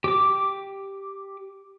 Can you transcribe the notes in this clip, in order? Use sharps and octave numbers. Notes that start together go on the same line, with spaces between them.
G4 D6